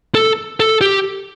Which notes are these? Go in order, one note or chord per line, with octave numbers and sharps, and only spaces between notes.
A4
A4
G4